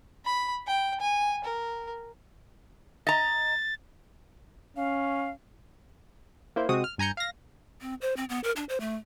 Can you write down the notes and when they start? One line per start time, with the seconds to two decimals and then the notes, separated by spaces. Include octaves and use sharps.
0.25 B5
0.67 G5
1.00 G#5
1.44 A#4
3.07 D#5 A#5 A6
4.77 C#4 F5
6.56 A#3 E4 C5
6.69 C3 G#3 C4 F#4 D#6
6.84 F6
6.98 G2 G#5 A#5 G6 C#7
7.17 F5 A#6
7.81 C4
8.01 C5
8.16 C4
8.29 B3
8.44 A#4
8.56 D4
8.69 C5
8.80 A3